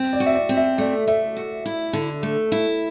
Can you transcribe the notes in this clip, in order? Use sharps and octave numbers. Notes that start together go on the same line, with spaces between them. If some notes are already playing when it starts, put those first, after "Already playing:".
Already playing: C4
D5
F#4
E5
D5
C4
E5
A3 D5
A3 E5
F#4
E4
D3
A3
E4